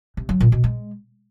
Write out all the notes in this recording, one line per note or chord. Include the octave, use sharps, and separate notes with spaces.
C3
F#3
A#2
B2
G#3